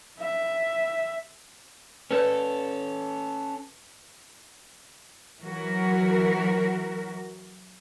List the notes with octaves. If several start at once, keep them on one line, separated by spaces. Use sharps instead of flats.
E5
C#4 A4 B4 C#5 D5
E3 F#3 F#4 A#4